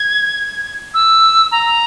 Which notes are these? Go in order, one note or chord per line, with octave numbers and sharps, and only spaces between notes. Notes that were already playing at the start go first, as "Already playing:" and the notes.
Already playing: G#6
E6
A#5